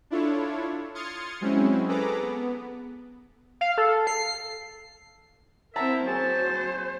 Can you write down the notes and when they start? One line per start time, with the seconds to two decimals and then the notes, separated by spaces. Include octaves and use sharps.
0.10 D4 E4 F4 A4 C#5
0.95 C6 D#6 F6 G#6 A6 C#7
1.41 F#3 G#3 C4 C#4 E4
1.88 G#4 A4 B4 A#5 D6
2.21 B3
3.61 F5
3.78 A4
4.07 C7
5.76 C4 E4 A#4 E5 F#5 A5 A#5
6.07 F#3 C4 G#4 C5 A5